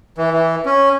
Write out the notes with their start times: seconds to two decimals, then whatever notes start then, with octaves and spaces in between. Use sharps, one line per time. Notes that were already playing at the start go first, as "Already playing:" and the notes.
0.18 E3
0.33 E3
0.65 C#4